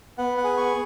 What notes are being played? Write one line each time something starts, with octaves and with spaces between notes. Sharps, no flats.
B3 F#5
F#5
G#4
C#6